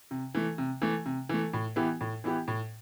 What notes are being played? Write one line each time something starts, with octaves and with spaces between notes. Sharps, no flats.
C3
E3 A3
C3
E3 A3
C3
E3 A3
A2
E3 B3 E4 G4
A2
E3 B3 E4 G4
A2